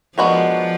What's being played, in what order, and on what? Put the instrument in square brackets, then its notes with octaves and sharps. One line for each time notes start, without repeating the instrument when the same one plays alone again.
[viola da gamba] F3 [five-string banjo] G#3 B3 D4 F#4 A#4